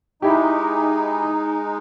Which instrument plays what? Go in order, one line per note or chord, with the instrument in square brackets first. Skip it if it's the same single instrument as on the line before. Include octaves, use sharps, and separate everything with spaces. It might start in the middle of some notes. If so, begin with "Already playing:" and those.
[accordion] G#3 D#4 [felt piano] E4 G4